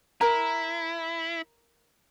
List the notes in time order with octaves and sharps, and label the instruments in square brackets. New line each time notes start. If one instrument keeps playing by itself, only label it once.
[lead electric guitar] E4 [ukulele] A#4 A#5